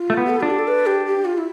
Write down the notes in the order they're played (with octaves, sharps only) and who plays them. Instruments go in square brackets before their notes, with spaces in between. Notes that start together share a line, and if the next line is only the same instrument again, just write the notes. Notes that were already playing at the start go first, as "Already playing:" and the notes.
Already playing: [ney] F4
[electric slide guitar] A3
B3
[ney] G4
A4
[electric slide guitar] D4 [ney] F4
[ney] G4
A4
B4
G4
G4
F4
E4